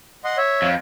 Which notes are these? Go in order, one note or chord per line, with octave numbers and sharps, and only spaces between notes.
D#5 F#5 C6
C#5 E5
F2